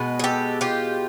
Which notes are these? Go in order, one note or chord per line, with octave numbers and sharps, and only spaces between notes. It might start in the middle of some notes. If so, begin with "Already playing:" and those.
Already playing: B2 G#3 B3
G#4
G4 A4
F4 G4